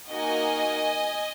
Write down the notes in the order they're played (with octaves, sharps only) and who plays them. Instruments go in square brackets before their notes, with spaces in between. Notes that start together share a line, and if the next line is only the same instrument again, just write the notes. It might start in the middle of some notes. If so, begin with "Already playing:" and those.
[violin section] A#3 D#4 F#4 D#5 G#5